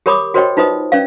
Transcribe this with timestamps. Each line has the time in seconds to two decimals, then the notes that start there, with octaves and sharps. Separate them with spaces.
0.06 G4 A#4 C#5 B5 D6 D#6
0.34 F#4 A#4 C5 C#5 D#5 G5
0.57 D#4 F4 B4 C5 D#5 D#6
0.92 C#4 B4 D5 F5